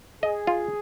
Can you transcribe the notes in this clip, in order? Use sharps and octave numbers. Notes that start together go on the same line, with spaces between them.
G#4 D#5
F4